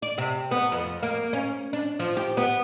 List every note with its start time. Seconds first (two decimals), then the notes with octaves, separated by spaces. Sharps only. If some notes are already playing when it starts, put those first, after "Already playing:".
0.02 D5
0.18 C3
0.51 B3
0.72 F2
1.03 A#3
1.33 C#4
1.73 D4
1.99 F3
2.17 G4
2.37 B3